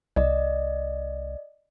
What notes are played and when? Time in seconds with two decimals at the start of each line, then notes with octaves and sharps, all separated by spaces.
0.16 C2 D5 D#5